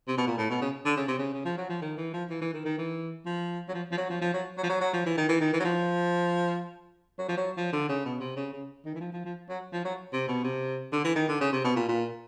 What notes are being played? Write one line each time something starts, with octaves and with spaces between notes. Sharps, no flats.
C3
B2
A#2
A2
B2
C#3
D3
C#3
C3
C#3
C#3
F3
F#3
F3
D#3
E3
F3
E3
E3
D#3
D#3
E3
F3
F#3
F3
F3
F#3
F3
F3
F#3
F#3
F3
F#3
F#3
F3
E3
D#3
E3
D#3
E3
F#3
F3
F#3
F3
F#3
F3
D3
C#3
B2
C3
C#3
C#3
D#3
E3
F3
F3
F3
F#3
F3
F#3
C3
B2
C3
D3
E3
D#3
D3
C#3
C3
B2
A#2
A#2